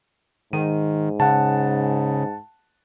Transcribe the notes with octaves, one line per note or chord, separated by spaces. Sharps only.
G#2 D#3 D#7
C#3 F#5 A5